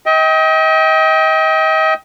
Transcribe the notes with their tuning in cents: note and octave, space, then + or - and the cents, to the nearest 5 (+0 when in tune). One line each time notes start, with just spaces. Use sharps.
D#5 +35 G5 +0